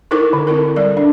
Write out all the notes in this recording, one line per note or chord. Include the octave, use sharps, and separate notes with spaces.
D#4 E4 A4 A#4 C5 D6
D3
C4 E4 A4 A#4
G3 A4 D5
D4